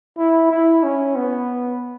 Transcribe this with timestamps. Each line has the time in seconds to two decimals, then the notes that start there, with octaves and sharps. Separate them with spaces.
0.18 E4
0.51 E4
0.83 C#4
1.16 B3